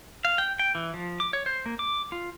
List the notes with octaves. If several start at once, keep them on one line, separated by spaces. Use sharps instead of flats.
F5
G5
G5
E3
F3
D6
C#5
C5
A#3
D6
F4